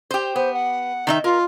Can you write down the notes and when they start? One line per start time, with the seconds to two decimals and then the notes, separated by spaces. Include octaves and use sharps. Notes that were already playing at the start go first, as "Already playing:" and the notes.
0.11 G4 C5
0.36 B3 C5
0.54 F#5
1.07 D#3 D#4 E5
1.24 F4 A#4